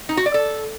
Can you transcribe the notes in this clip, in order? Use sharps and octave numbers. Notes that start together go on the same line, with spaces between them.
D#4
F#4
D5
A4